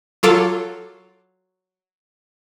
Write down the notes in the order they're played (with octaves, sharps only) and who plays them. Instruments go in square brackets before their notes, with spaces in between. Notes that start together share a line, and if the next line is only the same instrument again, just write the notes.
[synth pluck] F#3 F4 A4 D6